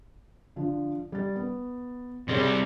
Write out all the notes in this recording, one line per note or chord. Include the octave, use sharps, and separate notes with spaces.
D3 F3
G3 A6
B3
C3 G3 C4 G#4 C#5